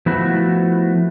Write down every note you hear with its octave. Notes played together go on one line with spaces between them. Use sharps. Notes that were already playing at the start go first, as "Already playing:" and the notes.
F3 A3 B3 E4 F#4